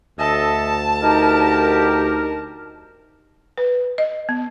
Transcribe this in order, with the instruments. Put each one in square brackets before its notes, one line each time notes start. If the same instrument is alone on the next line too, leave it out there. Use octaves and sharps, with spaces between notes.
[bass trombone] D2 [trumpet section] A4 D#5 E5 [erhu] A5
[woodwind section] D#4 A#4 [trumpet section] G4
[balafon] B4
D#5
B3